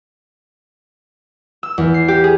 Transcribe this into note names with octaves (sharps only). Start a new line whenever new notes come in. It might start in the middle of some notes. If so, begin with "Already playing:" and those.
E6
E2
C7
G4
G#4